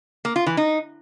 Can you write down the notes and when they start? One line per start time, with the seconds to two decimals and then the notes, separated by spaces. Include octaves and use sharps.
0.25 A#3
0.36 F4
0.46 E3
0.57 D#4